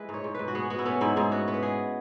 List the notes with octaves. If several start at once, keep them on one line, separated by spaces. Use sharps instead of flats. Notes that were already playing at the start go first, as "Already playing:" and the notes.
Already playing: G#3 E4 G#4 B4
G#2 C#5
G#2
G#2 B4
F#4
B3 G#4
B3 F#4
E4
B3 C#4
G#2 E4
G#2 G#4
B3 F#4
B3
B4
G#3 G#4